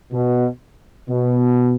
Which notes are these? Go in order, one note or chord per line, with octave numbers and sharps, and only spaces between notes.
B2
B2